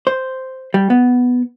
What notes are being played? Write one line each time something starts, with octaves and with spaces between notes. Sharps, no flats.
C5
G3
B3